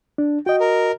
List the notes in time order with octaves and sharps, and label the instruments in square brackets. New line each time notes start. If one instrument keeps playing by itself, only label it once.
[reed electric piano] D4
[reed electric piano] F#4 D#5 [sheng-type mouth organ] G5
[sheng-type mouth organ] A#4